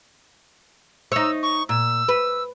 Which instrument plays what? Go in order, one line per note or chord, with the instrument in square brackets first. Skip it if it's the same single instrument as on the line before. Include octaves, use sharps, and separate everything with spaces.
[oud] D#4 C#5 [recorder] E6
[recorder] C#6
[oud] A#2 [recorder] E6
[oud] B4